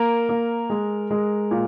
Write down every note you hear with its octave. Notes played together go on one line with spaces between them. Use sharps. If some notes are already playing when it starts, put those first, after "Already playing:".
Already playing: A#3 A#4
A#3
G#3
G#3
A#2